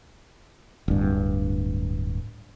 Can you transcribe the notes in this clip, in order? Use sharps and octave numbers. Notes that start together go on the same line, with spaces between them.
D1 G2